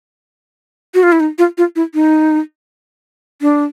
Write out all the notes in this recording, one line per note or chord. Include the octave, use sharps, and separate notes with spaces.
F#4
F4
E4
D#4
F4
F4
E4
D#4
D4